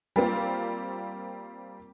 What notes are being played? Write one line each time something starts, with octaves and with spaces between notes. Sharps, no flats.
G3 A#3 C4 F4